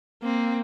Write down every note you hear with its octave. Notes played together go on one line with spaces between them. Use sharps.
A#3 C4